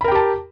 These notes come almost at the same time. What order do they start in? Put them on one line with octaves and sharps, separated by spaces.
B5 A#4 G5 G4 A5